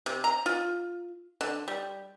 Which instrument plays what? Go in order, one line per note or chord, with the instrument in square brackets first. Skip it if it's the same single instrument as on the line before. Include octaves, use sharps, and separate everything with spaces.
[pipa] C3
A#5
F4
D3
G3